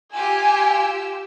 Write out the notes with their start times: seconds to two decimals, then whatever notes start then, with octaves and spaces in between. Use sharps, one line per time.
0.13 F4 G4 G#5 E6